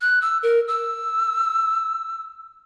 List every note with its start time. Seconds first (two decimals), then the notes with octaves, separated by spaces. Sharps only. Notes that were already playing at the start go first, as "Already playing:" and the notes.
0.01 F#6
0.22 E6
0.43 A#4
0.68 E6